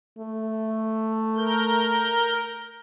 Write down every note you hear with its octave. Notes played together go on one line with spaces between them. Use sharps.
A3
A#4 G6